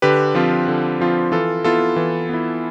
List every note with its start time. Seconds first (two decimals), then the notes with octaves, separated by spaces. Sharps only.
0.02 D3 G4 B4
0.35 F3 C4 F4
0.68 D3
1.01 F3 C4 F4
1.32 E3 F4 A4
1.64 B3 E4 F4 A4
1.96 E3
2.29 B3 E4